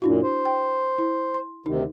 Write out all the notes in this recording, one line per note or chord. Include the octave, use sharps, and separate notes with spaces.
F#2 A#2 D4 E4 F#4
C5
G5
E4
C6
D2 C3 D#3 D#4